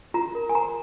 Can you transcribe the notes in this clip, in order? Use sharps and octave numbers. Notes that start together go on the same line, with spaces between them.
F4 A#5
A#4
G#5
C5 A#5